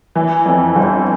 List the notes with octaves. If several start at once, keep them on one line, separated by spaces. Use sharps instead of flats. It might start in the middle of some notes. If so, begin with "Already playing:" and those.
E3
F2
G1